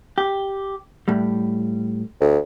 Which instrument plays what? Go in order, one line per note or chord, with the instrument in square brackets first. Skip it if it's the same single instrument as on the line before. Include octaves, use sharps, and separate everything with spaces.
[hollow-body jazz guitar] G4
A2 G3
[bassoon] D2